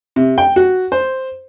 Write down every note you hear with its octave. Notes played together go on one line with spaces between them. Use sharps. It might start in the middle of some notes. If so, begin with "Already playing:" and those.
C3
G5
F#4
C5